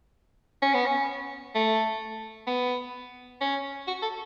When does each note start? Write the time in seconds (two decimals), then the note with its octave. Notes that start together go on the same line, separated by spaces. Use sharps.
0.62 C#4
0.74 B3
0.86 C#4
1.55 A3
2.47 B3
3.41 C#4
3.87 F#4
4.02 A4